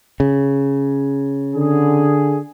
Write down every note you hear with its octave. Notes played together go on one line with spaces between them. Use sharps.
C#3
D3 G#4